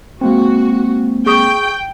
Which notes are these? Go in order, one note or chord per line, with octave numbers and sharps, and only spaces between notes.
G#3 A#3 C4 F#4
G#4 G5 C#6 D#6